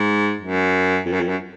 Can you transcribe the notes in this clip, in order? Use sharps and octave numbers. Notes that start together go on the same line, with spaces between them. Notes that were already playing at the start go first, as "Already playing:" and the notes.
Already playing: G#2
F#2
F2
F#2
F2
F#2